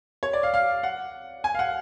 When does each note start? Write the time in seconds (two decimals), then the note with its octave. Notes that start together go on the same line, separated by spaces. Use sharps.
0.23 C#5
0.33 D5
0.43 F5
0.54 F5
0.83 F#5
1.44 G#5
1.55 F5
1.59 F#5